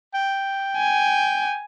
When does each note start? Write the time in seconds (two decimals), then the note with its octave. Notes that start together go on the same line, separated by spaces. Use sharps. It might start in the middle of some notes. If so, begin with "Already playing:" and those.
0.14 G5
0.77 G#5